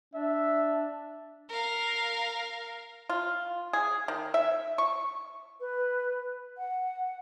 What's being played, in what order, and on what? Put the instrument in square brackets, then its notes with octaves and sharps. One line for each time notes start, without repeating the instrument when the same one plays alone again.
[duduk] D4 [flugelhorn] E5
[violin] A#4 F5
[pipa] F4
G#4
D#3
E5
C#6
[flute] B4
F#5